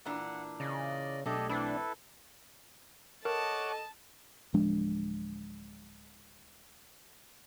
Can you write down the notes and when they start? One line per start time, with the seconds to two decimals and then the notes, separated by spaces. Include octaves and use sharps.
0.05 A#2 E3 D4 F#5
0.60 C#3 D5 D#5
1.26 B1 G#3 A3 D4 G4 A4 D#5
1.49 E3 C4 D4 E4 A4 B4
3.25 A4 A#4 C#5 D#5 F#5 A5 D6
4.54 D1 F3 G#3 D4